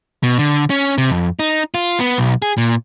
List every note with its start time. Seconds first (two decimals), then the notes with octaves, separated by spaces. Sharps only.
0.23 B2
0.39 D3
0.70 C#4
0.98 C3
1.10 F2
1.39 D#4
1.74 F4
2.00 B3
2.18 B1
2.42 G#4
2.58 A#2